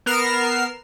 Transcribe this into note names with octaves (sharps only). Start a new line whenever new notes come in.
B3 A#4 F6 C7 E7